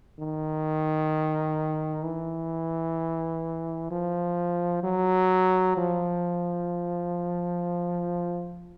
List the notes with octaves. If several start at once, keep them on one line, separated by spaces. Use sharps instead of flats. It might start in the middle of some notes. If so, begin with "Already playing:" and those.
D#3
E3
F3
F#3
F3